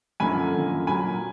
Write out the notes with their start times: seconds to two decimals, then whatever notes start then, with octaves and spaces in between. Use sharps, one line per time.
0.20 F#2 D3 F3 A#3 G#5 B5
0.54 F#2 D3 F3 A#3
0.87 A#2 F#3 A#3 G#5 B5